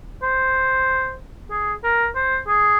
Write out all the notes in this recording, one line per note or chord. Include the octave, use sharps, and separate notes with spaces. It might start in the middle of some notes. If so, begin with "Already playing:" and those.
C5
G#4
A#4
C5
G#4